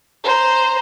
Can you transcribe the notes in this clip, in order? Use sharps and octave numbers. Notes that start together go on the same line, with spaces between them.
C5 A#5